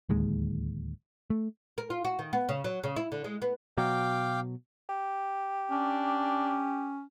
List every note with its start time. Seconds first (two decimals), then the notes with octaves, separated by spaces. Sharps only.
0.09 D1 D#2 G#3
1.30 A3
1.78 A#4
1.90 F4
2.05 F#4
2.19 D#3
2.33 B3
2.49 C#3
2.64 F#3
2.84 C#3
2.96 E4
3.12 D3
3.24 G#3
3.42 B3
3.77 B2 F#3 F5 G5 D6
4.89 G4
5.71 C#4 D4